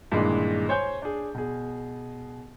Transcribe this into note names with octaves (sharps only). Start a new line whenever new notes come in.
G2 A#2 D#3 E3 G#3
C5 C#5 G#5 G6
D4 G#4
B2 G#4